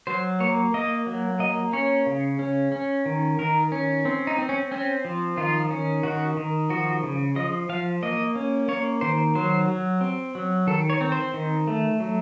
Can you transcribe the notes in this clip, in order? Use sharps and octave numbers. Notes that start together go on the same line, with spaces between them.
F#3 C5
A#3 C#5
A#3 D#5
F#3
A#3 D#5
C#4 C#5
C#3
C#4
C#4
D#3
D#3 A#4
C#4
C4
D#4
C4
C#4
C4 C#4
F3
D#3 F4
C#4
D#3 F#4
D#3
F3 F#4
C#3
F3 D#5
F3 F5
A#3 D#5
C#4
A#3 C#5
D#3 C5
F#3 C5
F#3
C4
F#3
D#3 A4
C#5
C4
C5
D#3
A3
F#3